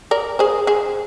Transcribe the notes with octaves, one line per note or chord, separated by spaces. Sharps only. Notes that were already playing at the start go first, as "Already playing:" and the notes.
A#4 D5
G#4 C5
G#4 C5